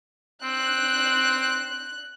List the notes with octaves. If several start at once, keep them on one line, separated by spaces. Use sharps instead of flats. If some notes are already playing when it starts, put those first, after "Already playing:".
C4 F#6